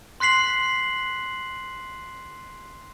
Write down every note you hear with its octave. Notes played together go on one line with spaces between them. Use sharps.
C6 F#6 B6 C7 F#7